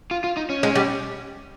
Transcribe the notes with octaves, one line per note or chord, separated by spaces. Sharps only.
F4
F4
D#4
C#4
G#3
G3